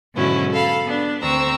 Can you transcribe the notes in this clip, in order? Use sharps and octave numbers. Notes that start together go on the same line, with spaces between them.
G#2 B2 D3 F#3 C#4 E4
A4 F5 B5
B3 D4
D2 C4 A#5 C#6 E6